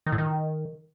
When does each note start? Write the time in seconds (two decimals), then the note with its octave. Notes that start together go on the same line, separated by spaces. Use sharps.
0.06 D#3
0.12 A2
0.18 D#3